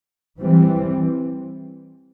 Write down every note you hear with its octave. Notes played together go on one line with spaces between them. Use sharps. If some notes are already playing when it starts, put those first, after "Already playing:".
E3 G3 C4